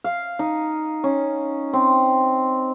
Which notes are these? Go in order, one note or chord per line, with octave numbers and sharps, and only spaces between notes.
F5
D#4
C#4
C4